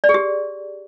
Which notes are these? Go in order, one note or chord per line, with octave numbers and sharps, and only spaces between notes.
D5
G#4
G4